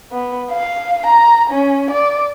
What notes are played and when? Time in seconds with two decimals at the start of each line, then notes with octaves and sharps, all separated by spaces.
0.12 B3
0.51 F5
1.07 A#5
1.50 C#4
1.91 D5